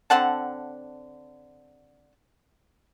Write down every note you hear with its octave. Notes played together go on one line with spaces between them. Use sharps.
D3 C4 F#5 A5